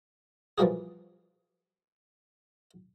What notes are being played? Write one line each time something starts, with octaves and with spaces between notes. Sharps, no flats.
E3 F3 G3 A#3 F#4 G#4